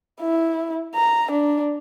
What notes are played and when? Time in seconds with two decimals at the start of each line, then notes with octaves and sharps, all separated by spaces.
0.21 E4
0.95 A#5
1.31 D4